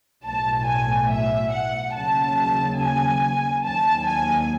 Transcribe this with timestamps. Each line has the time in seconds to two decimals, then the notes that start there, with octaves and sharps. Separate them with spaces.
0.25 B1 A2 F#3 A5
0.67 G#5
1.10 E5
1.52 F#5
1.95 D#2 C#3 F#3 A5
2.80 G#5
3.64 D#2 D#3 F#3 A5
4.07 G#5